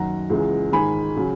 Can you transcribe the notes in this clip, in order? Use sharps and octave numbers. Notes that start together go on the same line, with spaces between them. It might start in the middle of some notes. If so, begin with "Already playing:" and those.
Already playing: F#2 D#3 F#3 F#5 A#5
C#2 C#3 E3 G#3
G#2 D#3 G#3 G#5 B5
C#3 F#3